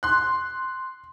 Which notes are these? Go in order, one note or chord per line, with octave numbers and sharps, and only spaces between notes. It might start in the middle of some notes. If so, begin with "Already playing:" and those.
C6 F#6